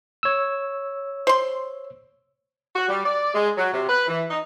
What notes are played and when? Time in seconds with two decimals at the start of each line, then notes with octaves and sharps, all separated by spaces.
0.23 C#5 E6
1.27 C5 C6
2.76 F#4
2.89 G3
3.05 D5
3.35 G#3
3.57 F#3
3.73 C3
3.89 B4
4.08 E3
4.30 D#4